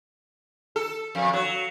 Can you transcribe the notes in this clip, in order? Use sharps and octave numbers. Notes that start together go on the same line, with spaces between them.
A4
F2
F#3